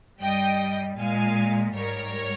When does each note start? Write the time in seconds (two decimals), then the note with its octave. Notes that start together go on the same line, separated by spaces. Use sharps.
0.22 G2 G3 D#5 G5
0.99 A#2 G#3 F5 G#5
1.75 G#2 G3 A#4 C#5